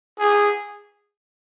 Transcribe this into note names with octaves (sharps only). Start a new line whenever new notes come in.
G#4